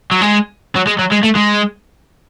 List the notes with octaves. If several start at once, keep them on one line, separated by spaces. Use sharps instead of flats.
F#3
G#3
F#3
G#3
F#3
G#3
A3
G#3